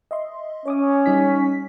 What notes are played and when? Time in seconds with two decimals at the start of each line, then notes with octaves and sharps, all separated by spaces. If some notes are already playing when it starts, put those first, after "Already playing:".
0.11 D#5 E5 C6
0.66 C#4 C#5 D6 D#6
1.06 G3 D#4 B6